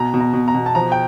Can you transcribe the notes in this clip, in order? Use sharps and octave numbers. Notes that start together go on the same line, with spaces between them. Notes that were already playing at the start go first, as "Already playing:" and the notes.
Already playing: B2 A#5
B2
A#5
B2
A#5
B2
A5
F3 A#5
G5